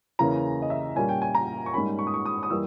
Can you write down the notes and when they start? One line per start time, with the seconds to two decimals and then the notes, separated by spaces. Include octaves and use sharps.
0.19 E2 C#3 E3 A#3 C#4 A#5
0.62 D#5
0.70 E5
0.96 A#2 G3 C#4 G#5
1.09 G5
1.22 G#5
1.35 A#5
1.66 C#6
1.73 G#2 G3 A#3 C#4 B5
1.99 C#6
2.07 D#6
2.14 C#6
2.26 D#6
2.43 D#6
2.50 E3 G3 A#3 E6